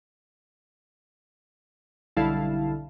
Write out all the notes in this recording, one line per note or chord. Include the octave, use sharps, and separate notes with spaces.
B1 D3 G3 E4 F5 A5